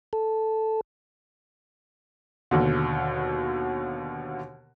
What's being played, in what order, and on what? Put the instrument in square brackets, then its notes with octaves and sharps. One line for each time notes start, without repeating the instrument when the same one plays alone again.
[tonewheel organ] A4
[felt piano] D#2 B2 D3